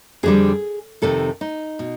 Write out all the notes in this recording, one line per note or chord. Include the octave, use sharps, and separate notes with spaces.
F2 D3 G3 G#4
F2 C3 D#3 A4
D#4
B2